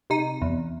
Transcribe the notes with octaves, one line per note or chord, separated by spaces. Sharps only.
C3 D#4
E2